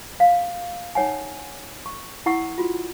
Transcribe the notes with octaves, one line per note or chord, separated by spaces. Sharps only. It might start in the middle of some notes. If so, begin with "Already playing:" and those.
F5
D#4 C#5 F#5 G#5
C#6
E4 F#5 C#6 E6
F4 F#4